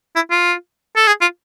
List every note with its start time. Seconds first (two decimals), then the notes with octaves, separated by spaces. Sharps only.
0.16 E4
0.31 F4
0.96 A4
1.08 G#4
1.21 F4